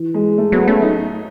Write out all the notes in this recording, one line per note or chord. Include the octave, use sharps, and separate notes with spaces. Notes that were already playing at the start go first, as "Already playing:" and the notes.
Already playing: E3
G#3
A3
F#3 B3
A3 C#4
D#4